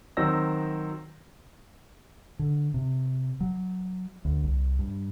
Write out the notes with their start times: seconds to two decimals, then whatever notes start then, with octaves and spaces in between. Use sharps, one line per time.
0.17 D#3 F#3 C4 E6 A#6
2.39 D3
2.74 C3
3.41 F#3
4.25 D2
4.44 C2
4.79 G2